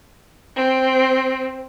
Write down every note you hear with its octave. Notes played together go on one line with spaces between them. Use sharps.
C4